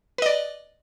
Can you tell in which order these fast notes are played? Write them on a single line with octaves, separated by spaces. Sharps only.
B4 D#5 D5